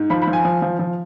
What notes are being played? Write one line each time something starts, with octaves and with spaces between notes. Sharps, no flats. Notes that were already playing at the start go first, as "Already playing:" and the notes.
Already playing: G#2
F3 B5
B5
F3
G#5
F3
F3
F3